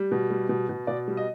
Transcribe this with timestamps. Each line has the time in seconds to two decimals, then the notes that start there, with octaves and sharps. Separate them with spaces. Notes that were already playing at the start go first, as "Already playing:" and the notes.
Already playing: G3
0.12 B2
0.30 G3
0.49 B2
0.69 B2
0.87 B2 D5
1.08 G3
1.17 D#5